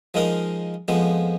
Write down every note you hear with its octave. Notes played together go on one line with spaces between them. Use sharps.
F3 G#3 D#4 A#4 F5
F2 F3 G#3 B3